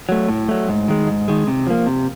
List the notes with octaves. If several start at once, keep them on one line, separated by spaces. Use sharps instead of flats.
F#3 A3
A2
F#3 A3
G#2
D#3 G#3
G#2
D#3 G#3
C3
F3 A#3
C3